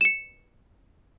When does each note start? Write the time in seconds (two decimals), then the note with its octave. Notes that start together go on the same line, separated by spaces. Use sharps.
0.01 C#7 E7